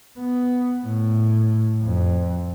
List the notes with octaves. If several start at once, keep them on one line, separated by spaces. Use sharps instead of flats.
B3
A2
F2